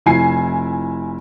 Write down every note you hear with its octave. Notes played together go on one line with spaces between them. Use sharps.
F1 E4 G#5 C7